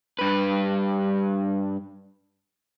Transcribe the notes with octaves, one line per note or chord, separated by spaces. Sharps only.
G2 B4